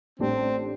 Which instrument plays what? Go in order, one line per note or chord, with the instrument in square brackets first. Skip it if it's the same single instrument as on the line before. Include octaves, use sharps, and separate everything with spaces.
[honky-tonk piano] A1 A2 G3 D4 [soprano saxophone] C4